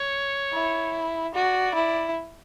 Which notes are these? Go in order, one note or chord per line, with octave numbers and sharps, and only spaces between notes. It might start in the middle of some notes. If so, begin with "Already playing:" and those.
Already playing: C#5
E4
F#4 D5
E4